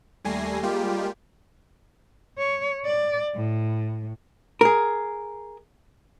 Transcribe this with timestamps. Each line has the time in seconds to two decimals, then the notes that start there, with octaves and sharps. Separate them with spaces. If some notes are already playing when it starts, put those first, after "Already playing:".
0.25 D#2 G3 A3 G#5 A#6 C7
0.62 G3 G#3 A#3 F4 G4
2.38 C#5
2.85 D5
3.35 A2
4.61 G#4 A#4